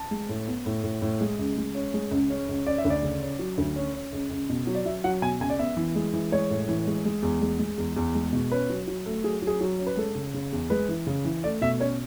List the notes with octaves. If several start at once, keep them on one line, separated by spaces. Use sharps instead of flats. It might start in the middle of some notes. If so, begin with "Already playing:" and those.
Already playing: A5
G#3
A2
B3
A2
A2
A2
G#3
C#2
G#3
C#4
G#3
C#2
C#4
C#2
C#4 D5
E5
D2
D5
C#3
C#4
F#3
D2
C#4
C#4
C#2
C#2
B2
F#3
D5
F#3 E5
F#3 F#5
B2 G#5
C#2 G#5
D5
B3 E5
E3
G#3
E3
G#3 C#5
A2
E3
G#3
G#3
E2
G#3
G#3
E2
E2
G#3
B2
C#4 B4
F#3
F#3
A3
F#3 G#4
F#3 G#4
F#3
C#4
B4
G#3 A4
C#3
C#3
E2
G#3 B4
E3
C#3
E3
A3 D5
B2 E5
C#4 C#5